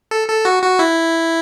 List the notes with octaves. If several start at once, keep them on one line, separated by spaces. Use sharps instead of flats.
A4
A4
F#4
F#4
E4